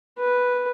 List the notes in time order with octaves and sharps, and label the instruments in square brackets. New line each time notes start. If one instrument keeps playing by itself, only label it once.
[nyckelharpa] B4